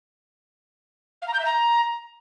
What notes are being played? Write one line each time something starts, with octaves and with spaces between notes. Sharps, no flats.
F5
A#5
G6
E5
A#5